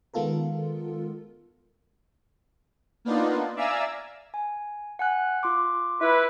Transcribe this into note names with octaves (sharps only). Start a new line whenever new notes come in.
D#3 G#3 B3 F4 A4 A#4
A#3 B3 D4 D#4 F4
D5 E5 F5 G#5 A#5 E6
G#5
F#5 G#5 F#6
F4 C6 D6
E4 B4